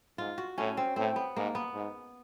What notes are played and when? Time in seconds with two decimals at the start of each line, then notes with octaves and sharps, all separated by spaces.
0.18 G#2 F4
0.38 F#4
0.58 A2 C#4
0.77 C4
0.96 A2 C4
1.16 B3
1.37 G#2 A#3
1.55 B3
1.74 G#2